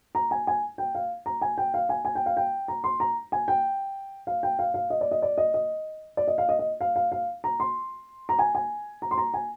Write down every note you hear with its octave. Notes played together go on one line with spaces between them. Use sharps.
A#5
G#5
G#5
G5
F5
A#5
G#5
G5
F5
G#5
G#5
G5
F5
G5
A#5
C6
A#5
G#5
G5
F5
G5
F5
F5
D#5
D5
D#5
D5
D#5
D#5
D5
D#5
F5
D#5
D#5
F5
F5
F5
A#5
C6
A#5
G#5
G#5
A#5
C6
A#5
G#5